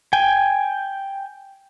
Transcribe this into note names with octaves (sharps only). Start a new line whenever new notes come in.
G5 G#5